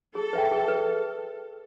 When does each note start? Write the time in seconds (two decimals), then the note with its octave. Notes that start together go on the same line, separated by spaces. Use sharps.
0.15 G#4 A4
0.33 B4 E5 G5
0.51 G#4
0.68 B4